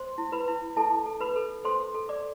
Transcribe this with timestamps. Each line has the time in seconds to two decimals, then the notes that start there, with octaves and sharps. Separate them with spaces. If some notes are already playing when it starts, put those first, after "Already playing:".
Already playing: C5 C6
0.18 E4
0.32 B4 B5
0.48 E4
0.76 E4 A4 A5
1.06 A4
1.20 B4 B5
1.36 A4
1.65 A4 C5 C6
1.94 A4
2.09 D5 D6